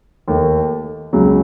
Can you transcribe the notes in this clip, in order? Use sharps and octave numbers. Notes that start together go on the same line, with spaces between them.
D#2 D#3 A3
C#2 C#3 F#3